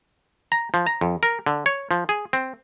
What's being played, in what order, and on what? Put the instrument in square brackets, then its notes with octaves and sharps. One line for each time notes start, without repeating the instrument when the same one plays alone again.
[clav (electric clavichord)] A#5
F3
A#5
F2
A#4
D3
C#5
F3
G#4
C4